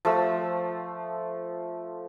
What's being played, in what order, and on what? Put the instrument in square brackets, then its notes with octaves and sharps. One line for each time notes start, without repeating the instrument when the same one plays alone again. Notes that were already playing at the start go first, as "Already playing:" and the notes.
[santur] F3 A3 E6